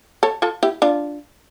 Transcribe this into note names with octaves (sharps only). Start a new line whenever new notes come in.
A4 C#5
F4 A4
E4 G4
D4 F4